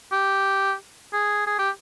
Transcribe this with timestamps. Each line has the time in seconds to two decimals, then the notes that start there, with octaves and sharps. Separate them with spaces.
0.12 G4
1.13 G#4
1.47 G#4
1.59 G4